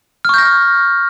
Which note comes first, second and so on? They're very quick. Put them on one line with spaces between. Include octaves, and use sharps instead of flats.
F6 C#6 G6 A#6